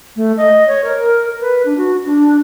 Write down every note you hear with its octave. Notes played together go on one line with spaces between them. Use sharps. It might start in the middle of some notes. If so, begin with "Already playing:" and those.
A3
D#5
C#5
A#4
B4
D4
F#4
D4